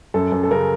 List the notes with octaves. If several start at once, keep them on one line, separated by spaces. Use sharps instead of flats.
F#2 A4
F#2
A4
C#3 A#4